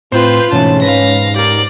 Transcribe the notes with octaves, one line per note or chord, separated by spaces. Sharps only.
A2 C4 F4 B4 C5
G#2 B2 E3 A3 C#4 A5
B4 F5 A#6
G4 A#4 D5